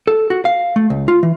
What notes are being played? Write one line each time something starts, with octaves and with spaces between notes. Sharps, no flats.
A4
F#4
F5
A3
C#2
F4
E3